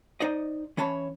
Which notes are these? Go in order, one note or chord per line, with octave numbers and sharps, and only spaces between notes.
D#4 C5 D5 D#5
E3 C#4 C#5 A5 B5